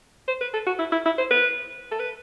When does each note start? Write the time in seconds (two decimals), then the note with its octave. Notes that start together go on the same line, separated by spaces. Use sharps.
0.28 C5
0.41 B4
0.54 A4
0.67 F#4
0.79 E4
0.92 E4
1.05 E4
1.18 C5
1.31 B4
1.91 A4
2.00 B4